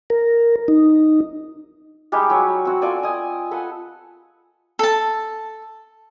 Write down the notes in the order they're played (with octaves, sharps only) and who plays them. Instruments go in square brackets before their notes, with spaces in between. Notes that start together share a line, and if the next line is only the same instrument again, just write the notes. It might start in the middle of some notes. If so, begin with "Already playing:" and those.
[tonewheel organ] A#4
D#4
[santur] G3 G#3 D#4 G4
F#3 C#5
C4 F#4
F4 A4 D5 G#5
D#5 G#5
A4 B4 F#5 G#5
[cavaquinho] A4 A5